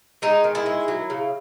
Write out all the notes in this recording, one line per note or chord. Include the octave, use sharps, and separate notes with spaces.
G#3 D#4
D#3
E4
G#3
F#3
C#3